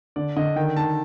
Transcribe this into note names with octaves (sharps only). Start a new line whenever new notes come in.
D3 D5
D3 D#5
D#3 G5
D#3 A5